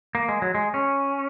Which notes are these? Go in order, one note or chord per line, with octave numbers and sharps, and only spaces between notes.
A#3
G#3
F#3
G#3
C#4